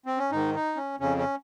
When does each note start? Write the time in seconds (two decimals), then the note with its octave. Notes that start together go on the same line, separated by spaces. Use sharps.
0.06 C4
0.18 C#4
0.31 G#2 D#3 D#4
0.54 D#4
0.76 C#4
1.00 F2 C#3 C#4
1.17 C#4